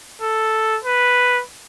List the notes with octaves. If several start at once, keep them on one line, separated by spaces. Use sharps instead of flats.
A4
B4